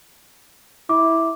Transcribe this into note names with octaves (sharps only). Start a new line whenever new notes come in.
E4 D6